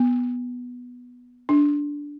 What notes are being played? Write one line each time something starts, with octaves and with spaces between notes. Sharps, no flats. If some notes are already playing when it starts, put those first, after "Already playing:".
Already playing: B3
D4